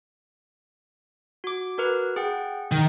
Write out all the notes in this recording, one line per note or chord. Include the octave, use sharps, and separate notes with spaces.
F#4 D6
F#4 A#4 B4
G#4 F#5 G5
D#3